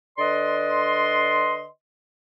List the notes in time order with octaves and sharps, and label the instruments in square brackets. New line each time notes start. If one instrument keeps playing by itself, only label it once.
[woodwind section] D3 B4 D5 D#5 C6